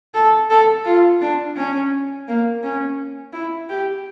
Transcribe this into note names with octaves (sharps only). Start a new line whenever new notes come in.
A4
A4
F4
D4
C#4
A#3
C#4
E4
G4